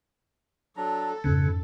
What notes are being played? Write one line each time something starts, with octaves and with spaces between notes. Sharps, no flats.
F#3 D4 A4 A#5
F2 G#2 C#3 C#4 B4